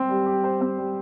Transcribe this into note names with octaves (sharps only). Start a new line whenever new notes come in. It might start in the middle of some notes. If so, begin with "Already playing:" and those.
Already playing: C4 C5
G3
G4
C5
C4
G3